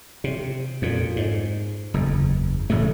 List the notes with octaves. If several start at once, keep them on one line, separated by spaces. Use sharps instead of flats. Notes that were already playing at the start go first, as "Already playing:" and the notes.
C3
F2 A#2
G#2
F#1 E2
D#1 A1 C#3 A3